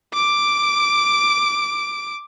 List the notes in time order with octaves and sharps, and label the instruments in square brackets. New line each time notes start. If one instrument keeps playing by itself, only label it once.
[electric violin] D6 D7